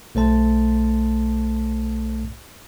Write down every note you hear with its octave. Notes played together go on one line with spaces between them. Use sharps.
B1 A3 C5 A5